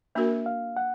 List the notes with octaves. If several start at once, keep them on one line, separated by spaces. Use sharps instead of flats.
A#3 D4 F#4 A#4 E5
F5
F#5